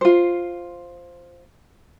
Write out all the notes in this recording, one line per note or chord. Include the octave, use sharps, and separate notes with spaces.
F4 C5